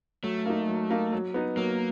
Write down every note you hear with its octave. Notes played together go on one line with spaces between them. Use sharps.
F#3 A3
A#3 D#4
F#3
A#3 D#4
F#3
B3 D#4
F#3 A#3